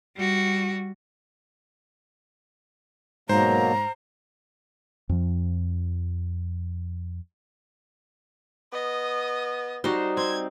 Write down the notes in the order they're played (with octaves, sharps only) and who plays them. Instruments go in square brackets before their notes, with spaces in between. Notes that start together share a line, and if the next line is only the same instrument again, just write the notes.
[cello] G3 F#4
[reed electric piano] G#2 [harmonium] B2 F#3 A#3 [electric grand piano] C5 [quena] A#5
[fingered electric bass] F2 F3
[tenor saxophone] B3 [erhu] D#5
[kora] G3 F#4 [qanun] D#4 C5
[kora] C4 [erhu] G#6